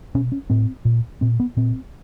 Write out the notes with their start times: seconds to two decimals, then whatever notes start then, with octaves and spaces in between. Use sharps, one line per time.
0.15 B2 C#4
0.32 C#4
0.50 A2 C4
0.85 A#2
1.21 A#2 C4
1.40 B3
1.57 A#2 C4